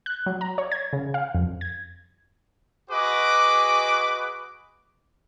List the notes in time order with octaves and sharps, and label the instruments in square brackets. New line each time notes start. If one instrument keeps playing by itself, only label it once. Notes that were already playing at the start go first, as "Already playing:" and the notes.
[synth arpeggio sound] F#6
F#3
A#5
C#5
G#6
C#3
F5
F2
G#6
[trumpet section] F#4 G#4 B4 D#5 D6